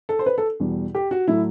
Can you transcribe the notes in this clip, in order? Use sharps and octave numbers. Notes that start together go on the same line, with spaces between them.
A4
C5
B4
A4
E2 B2 G3
G4
F#4
A2 F#3 A3 E4